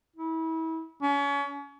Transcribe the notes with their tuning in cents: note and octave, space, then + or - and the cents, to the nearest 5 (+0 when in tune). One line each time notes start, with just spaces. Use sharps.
E4 -30
C#4 +35